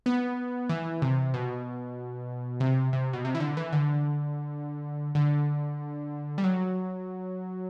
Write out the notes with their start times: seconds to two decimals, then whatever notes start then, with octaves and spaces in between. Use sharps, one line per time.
0.06 B3
0.69 E3
1.02 C3
1.34 B2
2.60 C3
2.93 C3
3.13 B2
3.25 C3
3.35 E3
3.40 D3
3.57 E3
3.73 D3
5.15 D3
6.38 G3
6.44 F#3